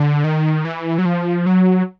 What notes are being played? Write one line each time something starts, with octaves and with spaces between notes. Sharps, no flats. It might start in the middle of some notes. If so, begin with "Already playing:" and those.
Already playing: D3
D#3
E3
F#3
F3
F#3